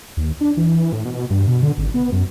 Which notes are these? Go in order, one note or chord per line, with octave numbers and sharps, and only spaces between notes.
D#2
D4
E3
A2
B2
G2
B2
D3
G#1
B3
F#2